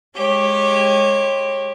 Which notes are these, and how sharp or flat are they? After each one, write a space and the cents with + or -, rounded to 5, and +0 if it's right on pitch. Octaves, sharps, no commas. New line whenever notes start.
G#3 +0 G4 +0 C#5 -25